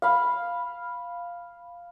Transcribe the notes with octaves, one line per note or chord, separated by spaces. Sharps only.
F5 B5